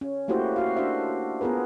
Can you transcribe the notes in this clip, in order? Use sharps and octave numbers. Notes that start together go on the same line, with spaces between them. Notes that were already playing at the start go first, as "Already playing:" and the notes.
C#4
A3 A#3 E4 F#4 G4 C5
F#4 F5
D4 F#4 C5 E5
B3 F4 G#4 A#4 B4